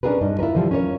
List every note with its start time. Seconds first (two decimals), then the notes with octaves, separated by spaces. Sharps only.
0.03 C#4 D4 F4 G#4 A#4 B4
0.21 G2 D4 D#4
0.39 E4 F4 A#4 B4
0.55 D3 E3 F3 G3
0.71 C#4 F4 A#4 C#5